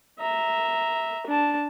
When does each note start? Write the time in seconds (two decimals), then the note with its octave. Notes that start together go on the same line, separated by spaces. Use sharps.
0.19 E5 A#5
1.27 D4 A5